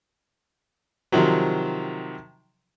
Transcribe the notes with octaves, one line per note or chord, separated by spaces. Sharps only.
C3 D#3 F3 F#3